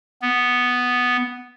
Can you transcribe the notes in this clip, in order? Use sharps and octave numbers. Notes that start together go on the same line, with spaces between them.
B3